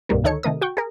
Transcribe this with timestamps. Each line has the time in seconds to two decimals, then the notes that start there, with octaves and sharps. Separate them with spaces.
0.09 C2 G2 B2 D#3 G3 A#3
0.24 D2 D#3 D#4 A4 C#5 C#7
0.43 C3 D#3 A3 A#4 D#6
0.61 F#4 G5 C#6
0.77 G#4 A#4